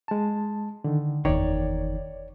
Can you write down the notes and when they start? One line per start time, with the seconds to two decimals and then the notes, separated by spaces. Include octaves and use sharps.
0.08 G#3 A5
0.84 D3 D#3
1.25 F#1 E2 D#3 C#5 D5